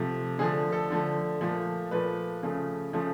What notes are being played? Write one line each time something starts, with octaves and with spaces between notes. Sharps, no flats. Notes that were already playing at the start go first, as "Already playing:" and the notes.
Already playing: C3 F3 A3
D3 F3 A3 G#4
A4
D3 F3 A3
A#2 F3 A3
A#2 F3 A3 B4
C#3 F3 A3
C#3 F3 A3